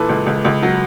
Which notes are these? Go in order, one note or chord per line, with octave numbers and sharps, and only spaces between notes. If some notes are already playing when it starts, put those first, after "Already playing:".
Already playing: A#2 E3 A4 B4
C#2
C#2
C#2
F#3